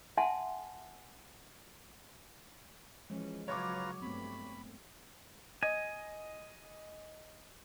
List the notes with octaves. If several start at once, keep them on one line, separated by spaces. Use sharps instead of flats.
E5 F#5 G#5 A5 C6
E3 F3 G#3 C#4
C#3 F#3 F4 B4 C#5 A#5 C#6 D6
G2 A3 B3 C4 B5
D#5 G#5